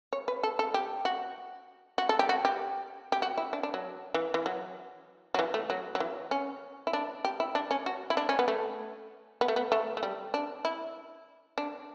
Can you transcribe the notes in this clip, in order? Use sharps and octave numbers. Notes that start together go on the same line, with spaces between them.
C#5
B4
A4
A4
G4
F#4
F#4
A4
G4
F#4
G4
G4
F#4
E4
D4
D4
F#3
E3
E3
F#3
F#3
E3
A3
F#3
F#3
E3
C#4
E4
D4
G4
E4
D4
C#4
F#4
E4
D4
C#4
B3
A3
B3
A3
B3
A3
A3
G3
D4
E4
D4